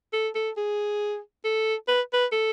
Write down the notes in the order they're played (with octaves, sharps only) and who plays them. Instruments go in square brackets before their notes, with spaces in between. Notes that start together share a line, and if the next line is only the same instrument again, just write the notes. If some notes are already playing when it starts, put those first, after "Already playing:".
[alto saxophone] A4
A4
G#4
A4
B4
B4
A4